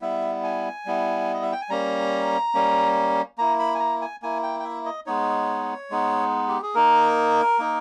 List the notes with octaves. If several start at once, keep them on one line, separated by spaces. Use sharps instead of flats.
G3 B3 E4 E5
G#5
G3 B3 E4
D#5
E5
G5
G#5
G3 A#3 C#4 A#5
G3 A#3 C#4
A#3 E4 A#5
B5
G#5
A#5
G#5
A#3 E4 G#5
G5
G5
E5
D#5
G#3 B3 D#4 C#5
G#3 B3 D#4
G4
G#4
A#3 D#4 A#4
A#3 D#4